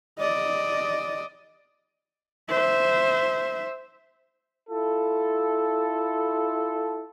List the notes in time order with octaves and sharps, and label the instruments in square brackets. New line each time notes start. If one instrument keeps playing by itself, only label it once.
[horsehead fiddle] D5 D#5
C5 E5
[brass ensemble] E4 F4 A4